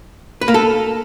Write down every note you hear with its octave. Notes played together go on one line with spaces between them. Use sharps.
B4
A#3
A4